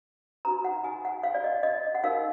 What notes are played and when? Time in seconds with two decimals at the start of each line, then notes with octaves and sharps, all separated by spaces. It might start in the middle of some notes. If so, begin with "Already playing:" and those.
0.45 D#4 F#4 B4 A#5
0.64 F#5
0.84 G#5
1.05 F#5
1.23 F5
1.34 D5
1.44 D#5
1.63 D#5
1.95 F#5
2.04 D#4 A#4 F5